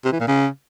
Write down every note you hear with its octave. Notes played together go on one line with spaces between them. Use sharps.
C3
E3
A#2
C#3